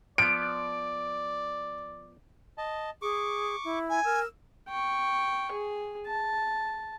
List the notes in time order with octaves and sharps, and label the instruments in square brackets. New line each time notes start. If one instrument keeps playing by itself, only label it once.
[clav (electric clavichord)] F3 B3 [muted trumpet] D5 [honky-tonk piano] D7
[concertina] D#5 A5
[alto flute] G#4 [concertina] C#6 D6
[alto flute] E4
[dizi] G#5
[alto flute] A#4 [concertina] E6
[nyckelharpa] G5 C#6
G#4
A5